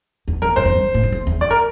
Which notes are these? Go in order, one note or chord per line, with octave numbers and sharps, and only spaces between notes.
E2
F2 A#4
G2 C5
F2
G2
A2
G2
F2
E2
F2 D5
A#4